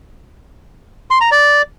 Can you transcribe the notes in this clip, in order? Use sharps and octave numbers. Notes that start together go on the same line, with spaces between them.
C6
A#5
D5